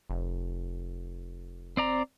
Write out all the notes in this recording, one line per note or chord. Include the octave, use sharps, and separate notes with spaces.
F1
C4 D5 A#5